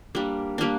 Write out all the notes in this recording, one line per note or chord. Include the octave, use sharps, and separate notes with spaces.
G3 A#3 D4
G3 A#3 D4